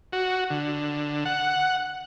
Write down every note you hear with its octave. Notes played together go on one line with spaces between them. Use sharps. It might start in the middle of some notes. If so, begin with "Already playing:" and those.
F#4
D3
F#5